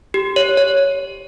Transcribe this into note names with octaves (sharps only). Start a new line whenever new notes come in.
G4
C#5
C#5